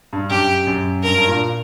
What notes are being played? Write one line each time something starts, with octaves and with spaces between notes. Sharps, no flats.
G2
F#2 G4
F#2
G2 A#4
G2
A#2